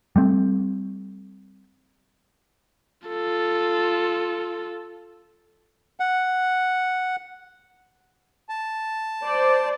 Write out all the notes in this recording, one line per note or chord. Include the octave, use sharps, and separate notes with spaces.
G3 A3 C4
F4 A4
F#5
A5
C5 D5